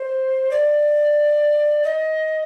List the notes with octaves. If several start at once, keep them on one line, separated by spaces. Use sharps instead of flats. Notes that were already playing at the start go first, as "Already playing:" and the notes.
Already playing: C5
D5
D#5